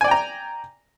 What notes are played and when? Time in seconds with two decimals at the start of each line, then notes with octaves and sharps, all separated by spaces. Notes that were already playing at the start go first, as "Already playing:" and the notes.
0.01 G#5
0.04 D5
0.08 G5
0.11 A#5